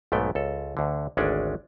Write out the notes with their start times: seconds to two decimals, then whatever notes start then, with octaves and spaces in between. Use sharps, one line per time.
0.12 B1 G#2 A3 B3 G5
0.35 C#2 A4
0.77 D2 D3
1.17 G#1 D2 G#3 C#4 D4 D5